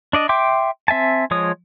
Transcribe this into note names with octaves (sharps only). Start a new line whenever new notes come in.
D4 D5 D#5
E5 G5 C6 D6 G6
C4 E5 G#5 A5
F3 G#3 C#5 D#6